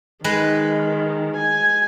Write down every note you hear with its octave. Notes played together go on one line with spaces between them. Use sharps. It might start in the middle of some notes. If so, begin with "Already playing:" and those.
D#3 G#3 B4
G#5